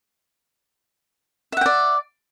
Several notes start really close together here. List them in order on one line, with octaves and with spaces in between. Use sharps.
E5 F#5 G5 D5